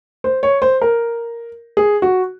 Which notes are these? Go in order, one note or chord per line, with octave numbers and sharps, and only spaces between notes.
C5
C#5
C5
A#4
G#4
F#4